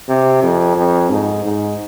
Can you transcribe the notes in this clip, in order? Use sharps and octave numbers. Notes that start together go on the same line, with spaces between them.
C3
F2
F2
G#2
G#2